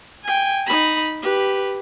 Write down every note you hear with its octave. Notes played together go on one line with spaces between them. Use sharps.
G5 G#5
D#4 B5
G4 B4